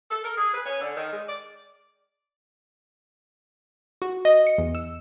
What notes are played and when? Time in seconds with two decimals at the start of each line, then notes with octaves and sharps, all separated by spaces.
0.10 A4
0.23 A#4
0.36 G#4
0.53 B4
0.65 C#4
0.81 D3
0.96 D#3
1.11 G#3
1.28 D5
4.02 F#4
4.25 D#5
4.47 C#7
4.58 E2
4.75 E6